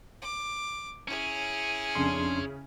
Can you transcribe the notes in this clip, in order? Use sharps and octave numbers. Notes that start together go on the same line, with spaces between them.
D6
C#4 E4 G#4
F2 C#3 D4 C6